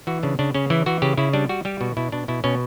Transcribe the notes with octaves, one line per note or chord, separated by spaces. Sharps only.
E3 F#4
C#3 D4
C#3 D4
C#3 C#4
E3 E4
E3 F#4
C#3 G4
C#3 E4
G3 D4
G3 F#4
G3 G4
B2 F#4
B2 E4
B2 D4
B2 E4
B2 C#4